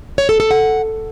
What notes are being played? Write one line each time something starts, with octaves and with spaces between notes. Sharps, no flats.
C#5
A4
A4
F#5